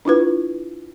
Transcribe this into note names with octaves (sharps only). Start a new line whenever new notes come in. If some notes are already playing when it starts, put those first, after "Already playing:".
D4 E4 F4 B4